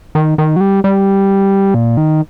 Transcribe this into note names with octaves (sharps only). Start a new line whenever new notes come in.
D#3
D#3
F#3
G3
G3
A#2
D#3